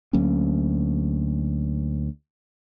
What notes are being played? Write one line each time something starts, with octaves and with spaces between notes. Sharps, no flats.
D2 F#3 A#3 C#4